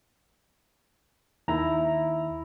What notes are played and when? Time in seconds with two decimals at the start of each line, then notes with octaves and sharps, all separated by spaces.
1.48 D#2 D#3 E4 A#5